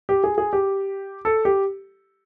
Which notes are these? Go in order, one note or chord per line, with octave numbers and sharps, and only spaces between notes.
G4
G#4
G#4
G4
A4
G4